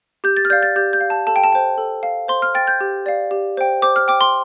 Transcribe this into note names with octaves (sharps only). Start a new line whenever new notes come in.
G4 G6
A6
F6
D5 F5 G6
A6
G4 G6
G6
F5
A5
A4 A5
G5
A5
C5 G5
A4
F5
C5 C6
F6
G5 A6
G6
G4
D5 F5
G4
C5 G5
C5 D6
F6
G5 D6
C6